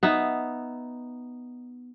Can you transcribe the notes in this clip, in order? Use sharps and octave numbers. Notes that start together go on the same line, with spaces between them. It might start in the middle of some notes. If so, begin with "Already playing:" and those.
B3 D#4 E5